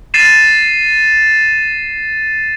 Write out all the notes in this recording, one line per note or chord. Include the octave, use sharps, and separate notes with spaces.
A6 C7 D#7 E7